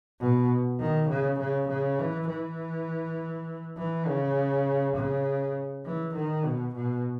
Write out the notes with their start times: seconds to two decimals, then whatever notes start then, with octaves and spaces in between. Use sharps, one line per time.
0.21 B2
0.80 D#3
1.09 C#3
1.40 C#3
1.69 C#3
1.99 E3
2.28 E3
3.77 E3
4.07 C#3
4.96 C#3
5.85 E3
6.15 D#3
6.45 B2
6.75 B2